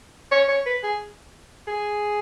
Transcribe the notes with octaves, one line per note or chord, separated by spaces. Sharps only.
C#5
C#5
B4
G#4
G#4